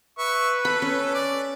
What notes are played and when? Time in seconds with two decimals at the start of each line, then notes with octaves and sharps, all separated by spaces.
0.19 B4 E5 C#6
0.65 A4 B5
0.82 C#4
1.15 D5